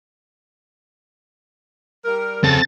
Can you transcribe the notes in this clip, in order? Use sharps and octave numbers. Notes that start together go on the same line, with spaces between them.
G3 A#4
C#3 C4 A4 A6